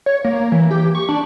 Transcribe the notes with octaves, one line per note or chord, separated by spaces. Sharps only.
C#5
A#3
E3
G4
C#6
D4